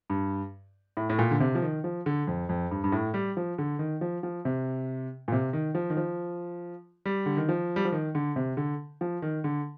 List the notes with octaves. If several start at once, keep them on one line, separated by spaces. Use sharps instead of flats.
G2
A2
A2
A#2
D3
C3
F3
D#3
F3
D3
F2
F2
G2
G2
A2
G3
F3
D3
D#3
F3
F3
C3
A#2
C3
D#3
F3
D#3
F3
G3
D3
D#3
F3
G3
F3
D#3
D3
C3
D3
F3
D#3
D3